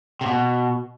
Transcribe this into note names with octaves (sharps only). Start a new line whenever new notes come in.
C3
B2